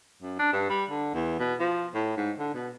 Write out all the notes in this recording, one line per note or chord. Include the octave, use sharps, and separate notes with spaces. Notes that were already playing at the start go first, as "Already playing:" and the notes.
F#2
D4
G2
G3
D3
E2
B2
F3
A2
G#2
D3
B2